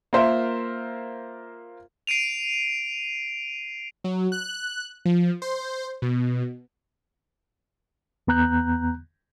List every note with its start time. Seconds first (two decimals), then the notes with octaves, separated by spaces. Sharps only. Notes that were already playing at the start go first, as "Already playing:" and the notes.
0.13 A#3 F4 A#4 C5 E5
2.07 C7 D7 D#7 F7
4.04 F#3
4.32 F#6
5.05 F3
5.42 C5
6.02 B2
8.27 E2 B3 A#5 F#6 G6